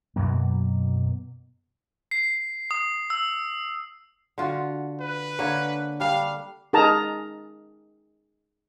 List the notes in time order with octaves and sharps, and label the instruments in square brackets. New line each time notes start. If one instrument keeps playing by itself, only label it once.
[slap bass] F#2 B2 F#3 A#3
[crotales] C7
D#6
E6
[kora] D3 F4 F#4
[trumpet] B4
[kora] D3 A#3 C#5
[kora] G3 D4 [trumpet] F5
[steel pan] D#4 G#4 A#4 A5 A#5